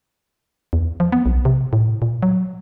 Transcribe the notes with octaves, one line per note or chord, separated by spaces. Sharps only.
E2
F3
B3
B1
C3
A2
A#2
F#3